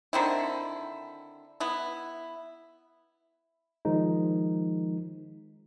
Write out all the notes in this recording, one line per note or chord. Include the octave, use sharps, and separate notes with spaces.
D3 D#3 C4 E4
B3 E4
D#3 F3 G#3 D#4